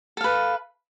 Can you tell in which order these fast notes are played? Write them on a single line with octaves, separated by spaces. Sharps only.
A4 F5 B4